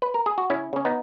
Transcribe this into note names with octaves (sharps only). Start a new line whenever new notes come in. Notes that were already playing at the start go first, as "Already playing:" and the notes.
B4
A#4
G#4
F#4
C#3 C#4 E4
C#3 C#4
B3 D#4